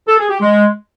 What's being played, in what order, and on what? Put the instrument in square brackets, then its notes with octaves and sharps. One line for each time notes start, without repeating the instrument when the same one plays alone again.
[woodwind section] A4
G#4
G4
G#3